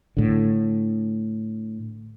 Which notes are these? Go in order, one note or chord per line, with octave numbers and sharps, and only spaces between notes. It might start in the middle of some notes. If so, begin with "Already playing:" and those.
A2 D3